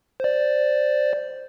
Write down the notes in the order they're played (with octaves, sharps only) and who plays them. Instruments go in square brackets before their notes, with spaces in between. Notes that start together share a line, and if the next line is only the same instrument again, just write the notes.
[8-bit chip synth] C5 D5